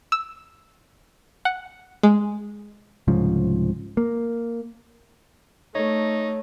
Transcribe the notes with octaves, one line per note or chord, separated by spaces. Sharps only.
E6
F#5
G#3
C2 G#2 C#3 F3
A#3
A3 D#4 C#5